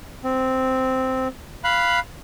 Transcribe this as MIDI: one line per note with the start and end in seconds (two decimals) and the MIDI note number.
0.24 1.28 60
1.64 2.00 77
1.64 2.00 83
1.64 2.00 90